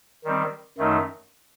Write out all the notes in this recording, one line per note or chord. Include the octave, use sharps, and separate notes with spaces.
D#3 G3 C4
F#2 D#3 A3 D#4